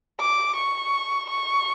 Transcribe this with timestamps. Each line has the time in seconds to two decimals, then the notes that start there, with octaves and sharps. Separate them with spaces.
0.20 D6
0.56 C#6
1.29 C#6